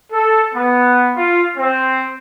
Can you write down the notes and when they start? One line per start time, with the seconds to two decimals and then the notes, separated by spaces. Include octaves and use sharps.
0.12 A4
0.53 B3
1.15 F4
1.58 C4